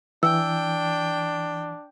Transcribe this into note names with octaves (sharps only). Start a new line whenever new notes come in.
E3 D4 G5 E6